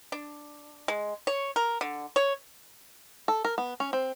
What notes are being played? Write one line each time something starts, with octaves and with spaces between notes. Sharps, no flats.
D4
G#3
C#5
A#4
D3
C#5
A4
A#4
B3
C#4
C4